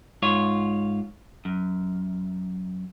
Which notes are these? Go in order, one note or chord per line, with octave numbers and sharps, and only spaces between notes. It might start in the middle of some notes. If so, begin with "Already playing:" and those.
G#2 F4 C#5
F#2